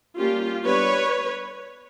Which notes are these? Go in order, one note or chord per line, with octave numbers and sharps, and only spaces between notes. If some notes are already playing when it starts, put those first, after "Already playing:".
G3 A#3 C#4 F4 G4
G3 B3 D4 B4 C#5